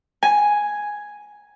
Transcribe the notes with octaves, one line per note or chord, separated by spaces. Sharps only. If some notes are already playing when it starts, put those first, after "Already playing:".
G#5